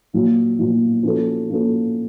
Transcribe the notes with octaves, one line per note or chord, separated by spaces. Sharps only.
A#2 F#3 A#3
A#2 F#3 A#3
F3 A#3 C#4 F#4 A4
F3 A#3 C#4 F#4 A4